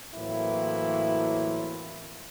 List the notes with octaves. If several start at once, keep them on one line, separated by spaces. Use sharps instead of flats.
A2 E3 F#3 A#3 C4 E4